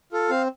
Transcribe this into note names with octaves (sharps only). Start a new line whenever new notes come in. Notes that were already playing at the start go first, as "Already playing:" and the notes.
F4 A4
C4 F5